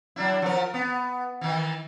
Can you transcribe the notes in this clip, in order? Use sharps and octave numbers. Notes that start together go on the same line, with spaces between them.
F#3 D4 E4
F3 A#4
B3
D#3 E3